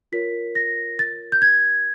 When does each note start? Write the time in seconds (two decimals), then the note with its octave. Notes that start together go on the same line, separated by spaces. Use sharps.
0.12 F4 A#4 C#5 B6
0.55 A#6
0.99 A6
1.32 G6
1.42 G#6